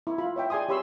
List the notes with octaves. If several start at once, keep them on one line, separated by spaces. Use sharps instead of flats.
E4
F4 B5
C#5 E5 G5
G#4 D5 G#5 C6 D#6
G4 C#5 B5 C6 E6